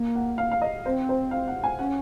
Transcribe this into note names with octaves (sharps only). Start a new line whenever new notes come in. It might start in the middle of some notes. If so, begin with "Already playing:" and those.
Already playing: A#3
F#5
F5
F5
D#5
C4 C5
C5
F5
F#5
G#5
C#4 F#5